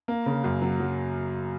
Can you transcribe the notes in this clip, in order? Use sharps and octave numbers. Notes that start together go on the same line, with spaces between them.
A#3
C#3
F#2
F#3
F#3